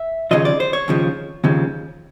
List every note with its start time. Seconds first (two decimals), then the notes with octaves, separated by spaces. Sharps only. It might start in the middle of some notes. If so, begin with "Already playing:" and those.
Already playing: E5
0.31 D#2 C#3 F3 D#5
0.45 D5
0.60 C5
0.73 C#5
0.88 D#2 C#3 F3
1.44 D#2 C#3 F3